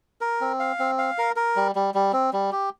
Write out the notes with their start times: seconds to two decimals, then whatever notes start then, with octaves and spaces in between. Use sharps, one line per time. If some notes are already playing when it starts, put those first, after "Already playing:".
0.21 A#4
0.41 C4
0.60 F5
0.79 C4
0.98 F5
1.18 A#4
1.36 A#4
1.56 G3
1.75 G3
1.94 G3
2.13 C4
2.33 G3
2.52 G4